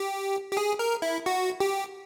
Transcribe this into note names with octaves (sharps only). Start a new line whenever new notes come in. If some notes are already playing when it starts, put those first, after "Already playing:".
Already playing: G4
G4
G#4
A#4
E4
F#4
G4